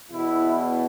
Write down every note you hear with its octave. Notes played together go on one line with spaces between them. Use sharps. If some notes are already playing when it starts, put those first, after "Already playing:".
E2 B2 E4